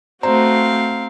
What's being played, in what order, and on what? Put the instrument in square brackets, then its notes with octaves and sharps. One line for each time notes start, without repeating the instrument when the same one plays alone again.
[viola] A3 F#4 [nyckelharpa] C4 F5 [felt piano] C5 [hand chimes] A#5